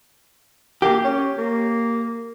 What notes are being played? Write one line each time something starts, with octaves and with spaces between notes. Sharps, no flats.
A#3 G4
C#4
A#3